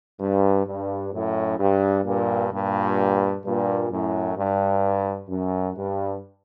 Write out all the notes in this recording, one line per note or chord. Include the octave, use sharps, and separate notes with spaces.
G2
G2
F#2 A2
G2
G2 A#2
G2 A#2
G2 A#2
F#2 A2
G2
F#2
G2